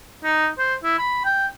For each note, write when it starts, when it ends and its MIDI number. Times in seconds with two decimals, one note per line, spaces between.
0.24 0.48 63
0.58 0.75 72
0.83 0.95 64
0.98 1.20 83
1.25 1.47 79